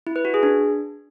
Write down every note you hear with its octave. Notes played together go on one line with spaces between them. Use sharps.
E4
B4
F#4
G#4
D4